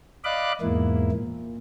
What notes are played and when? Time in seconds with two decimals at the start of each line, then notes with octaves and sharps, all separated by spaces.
0.24 D5 D#5 F5 B5 D6 F#6
0.61 E2 G#2 A#3 E4
1.12 A#2